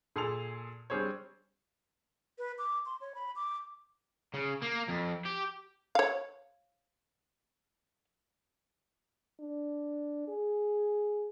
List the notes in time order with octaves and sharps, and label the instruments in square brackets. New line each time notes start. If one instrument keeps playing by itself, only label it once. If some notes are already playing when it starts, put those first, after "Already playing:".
[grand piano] A#2 G#4 A4 A5 C6 F7
G3 C4 D4 G#4 C5 C#5
[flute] B4
D6
C6
C#5
B5
D6
[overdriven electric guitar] C#3
A#3
F2
G4
[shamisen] C#5 F5
[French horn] D4
G#4